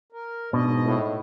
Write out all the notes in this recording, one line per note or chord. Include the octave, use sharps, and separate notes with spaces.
A#4
G#2 B2 D4 D#5
A2